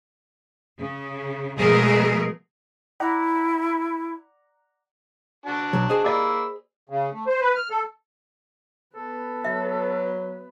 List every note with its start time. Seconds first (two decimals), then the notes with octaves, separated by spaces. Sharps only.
0.78 C#3
1.58 B2 F3 G#3 A3 G#4 A#4
3.00 E4 D5 F#5 A#5
5.46 D4 F#4 A5
5.73 B1 F#3
5.89 G#4 C5 D#5
6.04 A#3 G4 D5 B5 E6
6.89 C#3
7.12 A3
7.27 C5
7.41 B4
7.55 F6
7.70 A4
8.96 B3 A4 B4
9.45 F#3 E5